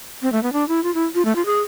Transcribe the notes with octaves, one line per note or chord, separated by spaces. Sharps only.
C4
A3
B3
D4
E4
F4
E4
F4
A3
F4
G#4